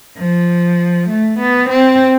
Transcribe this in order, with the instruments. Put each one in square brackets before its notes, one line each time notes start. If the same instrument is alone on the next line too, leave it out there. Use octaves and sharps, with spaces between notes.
[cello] F3
A3
B3
C4